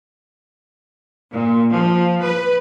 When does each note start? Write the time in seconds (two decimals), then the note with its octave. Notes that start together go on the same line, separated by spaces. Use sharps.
1.33 A#2
1.74 F3
2.24 B4